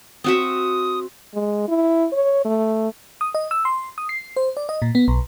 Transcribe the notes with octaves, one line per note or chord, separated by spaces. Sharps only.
C4 F#4 E5 D#6
G#3
E4
C#5
A3
D#6
D#5
E6
C6
D#6
C7
C5
D5
D#5
A#2
B3
B1